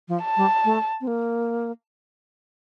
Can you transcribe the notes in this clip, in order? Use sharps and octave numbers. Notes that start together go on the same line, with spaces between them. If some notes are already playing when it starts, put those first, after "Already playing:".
F3
A5
G3
A3
C4
A#3